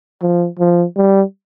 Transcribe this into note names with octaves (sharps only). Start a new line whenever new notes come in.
F3
F3
G3